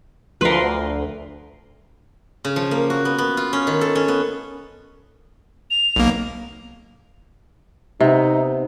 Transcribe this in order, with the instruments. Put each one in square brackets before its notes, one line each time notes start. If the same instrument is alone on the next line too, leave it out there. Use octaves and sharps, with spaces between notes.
[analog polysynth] D2 F3 C6 [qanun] A#4 B4
[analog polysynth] D2
[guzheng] C#3
F3
A#3
F#4
B3
B3
F4
C#4
D#3
A4
C#4
B3
[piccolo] F7
[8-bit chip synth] B1 A#3
[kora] C3 B3 [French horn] D#4